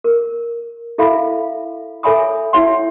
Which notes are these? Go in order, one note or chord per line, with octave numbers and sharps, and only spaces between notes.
A#4
E4 A4 E5 F5 B5
A4 C#5 E5 G#5 B5 D#6
E4 C#5 E5 F#5 C6